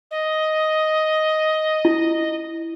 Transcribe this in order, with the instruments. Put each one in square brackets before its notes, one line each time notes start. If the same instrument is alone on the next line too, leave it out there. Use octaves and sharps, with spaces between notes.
[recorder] D#5
[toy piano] E4